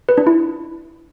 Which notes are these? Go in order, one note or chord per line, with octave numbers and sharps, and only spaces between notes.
B4
D4
E4